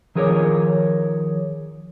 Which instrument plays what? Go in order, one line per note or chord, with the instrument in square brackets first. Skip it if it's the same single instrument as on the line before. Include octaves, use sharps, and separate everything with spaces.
[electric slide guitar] D#3 F3 G#4 A#4 C#5 D5